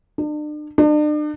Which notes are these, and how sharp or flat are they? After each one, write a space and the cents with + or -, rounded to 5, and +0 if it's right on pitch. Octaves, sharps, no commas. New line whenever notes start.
D4 +40
D4 +40